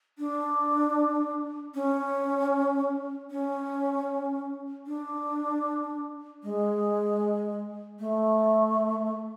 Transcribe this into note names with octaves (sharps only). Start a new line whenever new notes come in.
D4
C#4
C#4
D4
G#3
A3